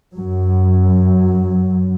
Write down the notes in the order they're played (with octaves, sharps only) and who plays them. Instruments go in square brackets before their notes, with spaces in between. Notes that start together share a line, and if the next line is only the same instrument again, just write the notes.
[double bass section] F#2 F#3